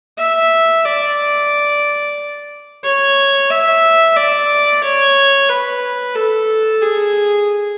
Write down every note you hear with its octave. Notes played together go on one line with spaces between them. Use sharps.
E5
D5
C#5
E5
D5
C#5
B4
A4
G#4